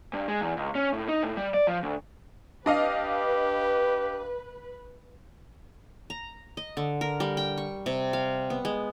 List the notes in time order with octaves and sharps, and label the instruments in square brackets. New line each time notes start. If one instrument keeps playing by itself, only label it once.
[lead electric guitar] G2
G#3
E2
C#2
C#4
A2
D#4
A2
G3
D5
F3
D2
[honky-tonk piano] D4 D#5 F5 [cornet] G4 [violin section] B4
[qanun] A#5
D#5
D3
A#4
G3
G5
C#6
C3
F5
B3
G#3